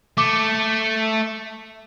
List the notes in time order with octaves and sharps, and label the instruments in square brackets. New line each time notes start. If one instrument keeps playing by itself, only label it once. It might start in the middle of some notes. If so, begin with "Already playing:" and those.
[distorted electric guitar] A3 [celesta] D6